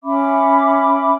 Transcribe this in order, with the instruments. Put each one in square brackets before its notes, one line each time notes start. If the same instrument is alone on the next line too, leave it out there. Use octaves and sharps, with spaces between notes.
[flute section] C#4 E5 B5 D6